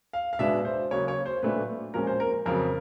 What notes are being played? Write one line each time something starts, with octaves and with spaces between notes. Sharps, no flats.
F5
F5
B2 G#3 B3 D4 E5
C5
C#3 F#3 A#3 C#5
C#5
C5
A#2 F#3 A3 D4 B4
A#2 F3 G#3 C#4 A#4
C5
A#4
F2 C#3 F#3 A#4